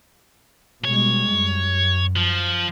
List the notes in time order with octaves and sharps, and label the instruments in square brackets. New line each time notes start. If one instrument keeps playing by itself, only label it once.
[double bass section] B2 G3 G#3 [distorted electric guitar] C#5
[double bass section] F#2
[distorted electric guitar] F3